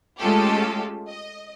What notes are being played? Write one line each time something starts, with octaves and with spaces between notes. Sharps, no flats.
G#3 A3 C#4 F4 G4 A4
D#5